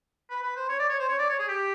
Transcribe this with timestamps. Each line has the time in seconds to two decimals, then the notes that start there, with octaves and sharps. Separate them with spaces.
0.30 B4
0.43 B4
0.56 C5
0.69 C#5
0.79 D5
0.90 C#5
0.99 C5
1.09 C#5
1.19 D5
1.29 C#5
1.39 G#4
1.48 G4